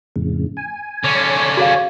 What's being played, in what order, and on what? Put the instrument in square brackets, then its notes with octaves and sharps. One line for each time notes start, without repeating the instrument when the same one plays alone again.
[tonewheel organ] F2 A2 C#3
G#5
[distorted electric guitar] D3 C#4 [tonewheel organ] C#5
[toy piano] F#4 G#4 F5